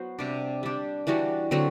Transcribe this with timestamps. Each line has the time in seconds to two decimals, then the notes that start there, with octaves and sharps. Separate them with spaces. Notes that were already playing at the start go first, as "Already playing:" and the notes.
Already playing: F#3 B3 F#4 C5
0.19 C3 G3 D4
0.63 G3 D4 G4
1.07 E3 G3 D4 F#4
1.51 D3 F#3 C4 F#4